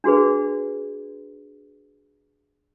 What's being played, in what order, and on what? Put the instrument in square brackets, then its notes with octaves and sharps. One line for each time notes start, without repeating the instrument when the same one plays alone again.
[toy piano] D4 F#4 G#4 B4